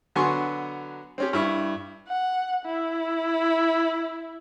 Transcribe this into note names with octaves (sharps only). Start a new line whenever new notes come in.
D3 F#3 B3 G#5 C6 C#6
C4 C#4 G4
G2 E4 C#6
F#5
E4